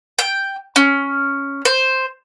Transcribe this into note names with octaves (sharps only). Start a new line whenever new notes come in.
G5
C#4
C5